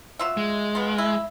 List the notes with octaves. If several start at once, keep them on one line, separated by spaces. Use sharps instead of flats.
F#3 F4 E5
G#3
B3 F4
E4